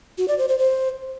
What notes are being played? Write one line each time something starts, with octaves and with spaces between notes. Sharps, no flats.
F#4
D5
C5
C5
C5